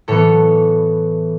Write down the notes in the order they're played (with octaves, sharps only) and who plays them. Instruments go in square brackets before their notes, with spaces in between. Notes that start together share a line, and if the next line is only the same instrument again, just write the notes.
[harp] A2 E3 B3 A4 C#5